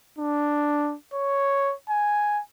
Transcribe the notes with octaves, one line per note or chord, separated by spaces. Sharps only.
D4
C#5
G#5